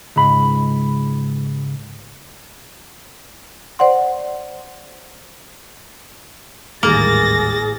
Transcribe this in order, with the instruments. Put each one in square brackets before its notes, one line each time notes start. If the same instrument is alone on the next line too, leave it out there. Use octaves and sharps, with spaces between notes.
[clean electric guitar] C#2 G#2 B5
[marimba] C5 D5 F#5 C6
[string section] A1 A6 A#6 [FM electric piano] D#2 G#2 G3 [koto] A#3 [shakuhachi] G#4